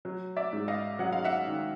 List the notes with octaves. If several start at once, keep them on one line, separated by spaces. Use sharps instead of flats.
F#3
D5 E5
G#2
D#5 F5
F#3 F#5
F5
E5 F#5
D#3